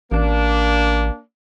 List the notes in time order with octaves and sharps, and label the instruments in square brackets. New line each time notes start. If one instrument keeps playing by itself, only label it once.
[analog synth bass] A1 [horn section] A#3 D4